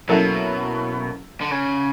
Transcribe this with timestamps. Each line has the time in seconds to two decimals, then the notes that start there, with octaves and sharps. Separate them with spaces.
0.09 B2 F#3 A#3 C#4 E4 A4
1.41 D3
1.51 C#3